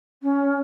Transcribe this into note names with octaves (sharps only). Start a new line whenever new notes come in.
C#4